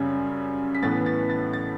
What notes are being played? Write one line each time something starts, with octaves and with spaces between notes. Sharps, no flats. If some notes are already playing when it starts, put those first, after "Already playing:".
Already playing: F#2 C#3 G3
B6
A2 E3 B3 A6
A6
A6
A6